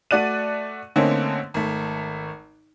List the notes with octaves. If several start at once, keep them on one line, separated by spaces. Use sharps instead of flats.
A3 F#4 D5 F#6 D#7
D3 A3 A#3 C4 C#4 D#4
G#1 A3